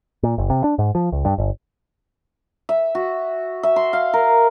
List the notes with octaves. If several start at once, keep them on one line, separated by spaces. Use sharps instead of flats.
A#2
F#1
C3
D4
G#2
F3
C#2
G2
G1
E5
F#4
E5
C6
F5
A#4